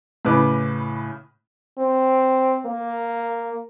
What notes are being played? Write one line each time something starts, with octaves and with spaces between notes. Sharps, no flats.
A2 C#3 B4 D6
C4
A#3